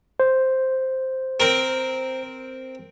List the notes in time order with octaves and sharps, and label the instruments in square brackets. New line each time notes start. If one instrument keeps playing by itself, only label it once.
[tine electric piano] C5
[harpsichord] C4 A#4